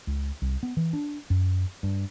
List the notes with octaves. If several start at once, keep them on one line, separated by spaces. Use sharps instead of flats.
C#2
C2
B3
E3
D4
F#2
G2